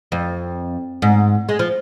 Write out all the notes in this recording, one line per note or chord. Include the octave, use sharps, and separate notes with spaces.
F2
G#2
G#3
F3